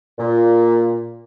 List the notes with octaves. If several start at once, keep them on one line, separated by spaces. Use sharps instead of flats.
A#2